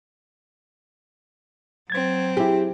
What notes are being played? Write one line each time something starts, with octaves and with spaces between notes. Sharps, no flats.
F#3 C4 G#6 A6
E4 G4 G#4